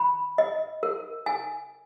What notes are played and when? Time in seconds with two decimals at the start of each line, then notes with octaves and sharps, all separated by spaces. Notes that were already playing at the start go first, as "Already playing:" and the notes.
Already playing: B5
0.38 D#5
0.83 A#4
1.26 G#5